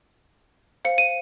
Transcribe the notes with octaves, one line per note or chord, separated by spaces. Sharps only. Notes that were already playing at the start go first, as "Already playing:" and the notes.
C5 F5 C#7
D#7